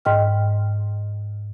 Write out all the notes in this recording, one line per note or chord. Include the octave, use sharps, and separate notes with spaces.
G#2 D#5 G5 F6